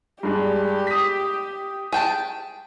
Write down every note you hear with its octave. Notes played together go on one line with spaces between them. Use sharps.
G2 G#3 D4 G4
D#6 B6
G#4 G5 A5